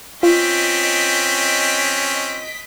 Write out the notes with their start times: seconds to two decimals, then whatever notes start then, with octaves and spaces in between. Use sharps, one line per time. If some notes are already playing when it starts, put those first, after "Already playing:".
0.23 C4 C#4 F4 D#5 B6 D7